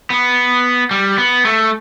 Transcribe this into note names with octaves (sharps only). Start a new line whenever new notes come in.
B3
G3
B3
A3